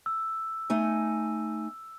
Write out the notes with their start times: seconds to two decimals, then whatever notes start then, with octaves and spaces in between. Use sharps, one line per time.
0.06 E6
0.70 A3 D#4 G#5